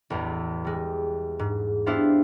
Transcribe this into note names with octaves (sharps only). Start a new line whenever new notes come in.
A1 E2
G3 G#3
G#2
B3 D4 E4 G4 C5 F5